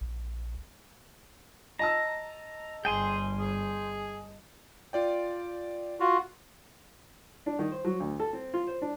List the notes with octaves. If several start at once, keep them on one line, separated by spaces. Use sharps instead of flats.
A#1
D#5 A5 A#5 E6
G1 G#4 G5 G#5 C6
G#4
F4 D5 G5
F4 F#4
D4
D#3
C5
F#3
D2
A4
C4
F4
C5
D4